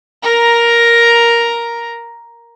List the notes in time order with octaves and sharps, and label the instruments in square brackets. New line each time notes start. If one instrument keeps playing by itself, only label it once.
[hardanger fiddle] A#4 A#5